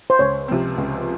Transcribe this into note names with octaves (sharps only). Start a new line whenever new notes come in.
C5
C#2 C#5
C3 F3 C4
C#2